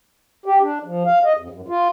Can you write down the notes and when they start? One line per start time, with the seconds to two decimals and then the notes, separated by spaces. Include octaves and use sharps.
0.46 G4
0.62 D4
0.84 F3
1.06 F5
1.24 D#5
1.37 F2
1.50 F#2
1.68 F4